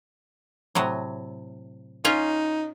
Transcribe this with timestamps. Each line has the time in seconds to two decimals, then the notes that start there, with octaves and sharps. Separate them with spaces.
0.75 A2 C3 F#3
2.05 C#4 D#4 F4 C#5